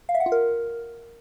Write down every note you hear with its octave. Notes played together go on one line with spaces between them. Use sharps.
F5
E5
F#5
F4
A#4